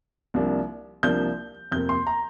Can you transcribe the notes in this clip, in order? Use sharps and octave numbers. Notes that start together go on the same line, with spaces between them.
C2 C3 F3 A#3 D4
C2 C3 F3 A#3 D4 G6
F2 C3 A#3 G6
C6
A#5